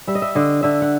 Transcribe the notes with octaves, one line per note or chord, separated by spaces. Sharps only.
G3 E5
D#5
E5
D3 D#5
D3 E5
F#5